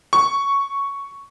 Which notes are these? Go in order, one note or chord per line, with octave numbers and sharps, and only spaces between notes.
C#6